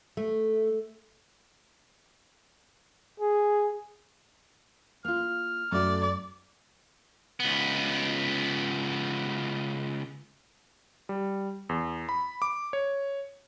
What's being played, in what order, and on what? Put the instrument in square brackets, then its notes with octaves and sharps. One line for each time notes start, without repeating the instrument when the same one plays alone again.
[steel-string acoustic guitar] A3
[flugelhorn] G#4
[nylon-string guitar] A#3 F4 [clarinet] F6
[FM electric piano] F#2 [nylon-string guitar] A3 F#4 [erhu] D5
[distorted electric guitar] C#2 B3
[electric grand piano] G3
E2
B5
D6
C#5